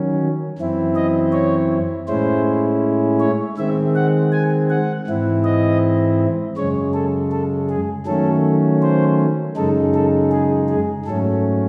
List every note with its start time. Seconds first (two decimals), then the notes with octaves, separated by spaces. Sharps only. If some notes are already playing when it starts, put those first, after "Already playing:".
Already playing: D#3 F#3 C#4
0.59 F#2 E3 C4 E4
0.96 D#5
1.32 C#5
2.08 A2 G#3 C#4 E4 C5
3.20 C#5
3.58 D#3 G#3 C4 E5
3.95 F#5
4.32 G#5
4.70 F#5
5.07 G#2 E3 C4 E4
5.44 D#5
6.57 F#2 C#3 G#3 C#5
6.94 A4
7.32 A4
7.69 G#4
8.06 D#3 F#3 A3 C#4 A4
8.82 C5
9.56 F#2 C#3 G#3 D#4 A4
9.94 A4
10.32 G#4
10.69 G#4
11.06 G#2 F#3 A3 C#4 A4